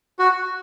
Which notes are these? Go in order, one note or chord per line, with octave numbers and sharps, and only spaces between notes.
F#4